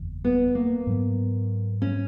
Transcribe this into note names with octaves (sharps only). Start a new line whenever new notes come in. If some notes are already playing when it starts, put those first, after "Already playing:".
Already playing: F#1 E2
B3
A#3
G#2 F#3 B3
C#4